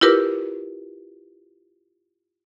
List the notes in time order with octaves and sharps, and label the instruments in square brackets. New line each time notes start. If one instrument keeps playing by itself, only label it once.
[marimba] E4 F4 G4 A#4 B4 D6